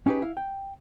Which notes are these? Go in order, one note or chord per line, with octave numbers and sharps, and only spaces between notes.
C#4 D#4 G4 G#4 B4
E4 F5
G5